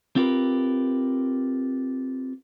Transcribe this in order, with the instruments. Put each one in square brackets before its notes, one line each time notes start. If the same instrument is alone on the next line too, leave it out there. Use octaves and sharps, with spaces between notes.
[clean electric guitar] C4 F4 G4 A#4 B4